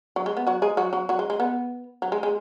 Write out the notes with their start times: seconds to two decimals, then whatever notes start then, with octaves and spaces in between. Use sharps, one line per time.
0.16 F#3
0.26 G#3
0.37 B3
0.47 F#3 F#4
0.62 G#3 G#4
0.77 F#3 F#4
0.93 F#3 F#4
1.09 F#3 F#4
1.19 G#3
1.30 G#3
1.40 B3
2.02 F#3
2.12 G#3
2.23 G#3